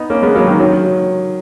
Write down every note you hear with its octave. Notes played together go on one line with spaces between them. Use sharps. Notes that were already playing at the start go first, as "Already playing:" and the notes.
Already playing: B3 D#4
A#3 C#4
G#3 B3
F#3 A#3
D#3 F#3
D#3 F#3